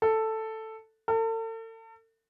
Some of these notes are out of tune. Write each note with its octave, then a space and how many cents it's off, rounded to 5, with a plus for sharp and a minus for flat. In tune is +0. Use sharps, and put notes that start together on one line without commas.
A4 +5
A4 +40